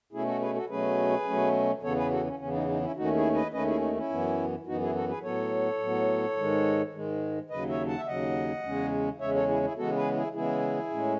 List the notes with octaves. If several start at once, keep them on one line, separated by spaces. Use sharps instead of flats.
B2 A3 C#4 E4 G#4
F#4 A4
G#4 B4
F#4 A4
B2 F#3 A3 C#4 G#4 B4
B2 F#3 A3 C#4
E2 C#3 E3 B3 A4 C#5
G#4 B4
F#4 A4
C#4
E2 C#3 E3 B3 C#4
D#4
D#4
C#4 E4
D#2 D#3 A3 C#4 D#4 F#4
E4 G#4
B4 D#5
D#2 D#3 A3 C#4 B4 D#5
E4 G#4
D#4
C#4 E4
F#2 E3 B3
F#2 E3 B3 D#4 F#4
E4 G#4
F#4 A4
G#4 B4
A2 F#3 B3 A4 C#5
A2 F#3 B3
G#2 D#3 G#3
G#2 D#3 G#3
D#2 C#3 F#3 B4 D#5
C#5 E5
F#5 A5
E5
D#2 C#3 F#3 D#5 F#5
E2 C#3 G#3 C#4
E2 C#3 G#3 C#4 C#5 E5
A4 C#5
E4 G#4
E4 G#4
C#3 E3 G#3 B3 F#4 A4
G#4 B4
E4 G#4
C#3 E3 G#3 B3 E4 G#4
A2 G#3 C#4